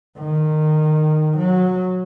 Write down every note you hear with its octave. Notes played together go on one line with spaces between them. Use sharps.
D#3
F#3